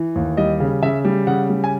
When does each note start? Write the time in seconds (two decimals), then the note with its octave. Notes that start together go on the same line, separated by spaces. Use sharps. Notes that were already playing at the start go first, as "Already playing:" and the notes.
Already playing: E3
0.16 D#2
0.37 G3 D#5
0.60 C#3
0.82 C#3 E5
1.05 G3
1.27 C#3 F#5
1.50 G3
1.64 G#5